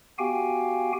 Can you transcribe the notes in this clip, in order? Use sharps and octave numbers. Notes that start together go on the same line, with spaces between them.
B3 F#4 G4 F5 G5 G#5